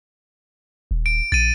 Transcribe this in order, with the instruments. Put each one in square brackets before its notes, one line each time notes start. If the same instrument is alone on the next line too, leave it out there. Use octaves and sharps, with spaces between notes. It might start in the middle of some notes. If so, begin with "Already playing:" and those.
[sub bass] D#1
[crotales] D7
[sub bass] A#1 [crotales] A6 D#7